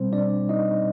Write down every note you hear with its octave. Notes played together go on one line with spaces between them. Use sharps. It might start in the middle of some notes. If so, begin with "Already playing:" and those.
Already playing: B2 G3 C4 C5
D4 D5
D#4 D#5